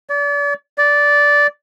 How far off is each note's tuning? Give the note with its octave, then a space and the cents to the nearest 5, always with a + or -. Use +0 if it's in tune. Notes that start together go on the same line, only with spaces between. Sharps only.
D5 -40
D5 -10